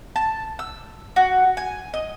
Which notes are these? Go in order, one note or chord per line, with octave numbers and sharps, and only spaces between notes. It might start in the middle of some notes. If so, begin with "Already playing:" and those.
A5
E6
F#4
G#5
D#5